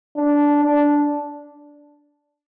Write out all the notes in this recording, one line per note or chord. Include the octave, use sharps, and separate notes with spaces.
D4
D4